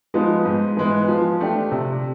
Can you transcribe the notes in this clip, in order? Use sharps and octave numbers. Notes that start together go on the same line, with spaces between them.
F3 G#3 B3 D#4
G#2
E3 G#3 B3
F3
A3 D4 G4
C3